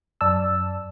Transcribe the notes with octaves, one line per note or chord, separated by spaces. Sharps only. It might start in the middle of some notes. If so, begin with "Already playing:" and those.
F#2 D5 A5 E6